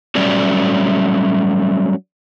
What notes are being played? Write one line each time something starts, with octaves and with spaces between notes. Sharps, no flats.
F#3 G3 A3 C#4 D5